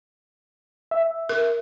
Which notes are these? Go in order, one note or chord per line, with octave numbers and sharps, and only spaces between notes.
E5
A#4